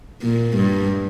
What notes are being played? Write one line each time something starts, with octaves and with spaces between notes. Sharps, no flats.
A#2
G2